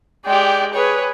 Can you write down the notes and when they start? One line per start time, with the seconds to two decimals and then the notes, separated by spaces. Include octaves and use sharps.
0.26 G#3 G4 D5 G5
0.74 G#4 B4 C#5